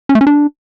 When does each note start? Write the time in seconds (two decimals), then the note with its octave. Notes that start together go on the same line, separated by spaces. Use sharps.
0.09 C#4
0.15 A3
0.21 C#4
0.27 D4